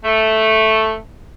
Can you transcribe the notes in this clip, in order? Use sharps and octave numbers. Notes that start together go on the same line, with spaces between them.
A3